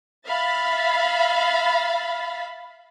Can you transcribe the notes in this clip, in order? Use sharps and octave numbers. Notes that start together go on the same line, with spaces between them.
E5 F5 B5 A6 B6